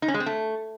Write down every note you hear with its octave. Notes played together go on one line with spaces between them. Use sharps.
D#4
C#4
G#3
C4
A3